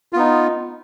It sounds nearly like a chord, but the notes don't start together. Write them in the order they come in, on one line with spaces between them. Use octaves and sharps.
F4 B3 D#4